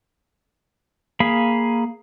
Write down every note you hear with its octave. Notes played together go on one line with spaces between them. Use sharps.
A#3 G#4 F5 B5